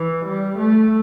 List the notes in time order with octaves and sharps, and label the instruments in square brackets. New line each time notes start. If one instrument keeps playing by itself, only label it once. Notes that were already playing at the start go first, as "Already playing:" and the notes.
Already playing: [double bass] E3
G3
A3